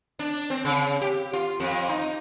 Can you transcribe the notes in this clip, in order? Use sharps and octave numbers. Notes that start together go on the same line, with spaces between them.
D4
C4
C#3
G4
F4
F2
D#4